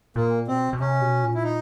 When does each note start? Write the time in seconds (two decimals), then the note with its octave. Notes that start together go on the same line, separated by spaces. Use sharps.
0.16 A#2 A#3
0.48 B2 C4
0.73 B2
0.80 C3 C#4
1.01 B2
1.23 A#2
1.35 E4
1.44 D#4